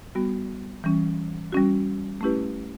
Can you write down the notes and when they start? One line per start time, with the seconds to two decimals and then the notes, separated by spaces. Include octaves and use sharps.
0.15 G3 B3 F#4
0.84 E3 G3 C#4
1.52 G3 C#4 F#4
2.21 A3 C#4 E4 G4 B4